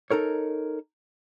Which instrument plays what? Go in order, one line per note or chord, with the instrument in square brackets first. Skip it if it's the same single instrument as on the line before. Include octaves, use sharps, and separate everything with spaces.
[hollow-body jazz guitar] D#4 A4 A#4 C#5